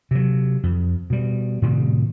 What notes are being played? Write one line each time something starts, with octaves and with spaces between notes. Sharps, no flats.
C3 F#3
F2
B2 G3
A2 C3 D#3 G3